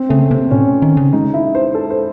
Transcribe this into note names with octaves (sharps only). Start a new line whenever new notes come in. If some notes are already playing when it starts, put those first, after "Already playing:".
Already playing: C4
C#3 A3
C3 C4
A2 C#4
D#3
C#3
G#3 D#4
E4
C5
A4
C5